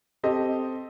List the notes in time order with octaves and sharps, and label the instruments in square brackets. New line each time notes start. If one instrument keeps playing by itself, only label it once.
[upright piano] C4 G4 A4 D#5